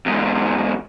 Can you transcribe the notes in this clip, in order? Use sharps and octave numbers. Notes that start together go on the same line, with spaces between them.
E2 G#2